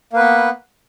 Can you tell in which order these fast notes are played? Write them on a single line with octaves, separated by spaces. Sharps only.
A#3 B4 B3